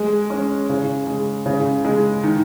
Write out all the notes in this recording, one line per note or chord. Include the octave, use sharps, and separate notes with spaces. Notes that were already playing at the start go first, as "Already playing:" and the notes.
Already playing: G#3
C#4
C#3
G#3
C#3
G#3
D#3